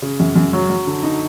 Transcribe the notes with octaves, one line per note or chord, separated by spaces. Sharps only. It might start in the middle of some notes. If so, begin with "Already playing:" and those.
C#3
F#2
F#2
F#3
F#3
D3
D#4